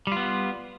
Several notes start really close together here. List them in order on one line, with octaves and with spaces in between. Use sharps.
G3 F4 B3